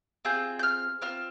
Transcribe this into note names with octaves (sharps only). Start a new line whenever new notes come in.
C4 F4 G#4 G6
G6
F6
C4 F4 F6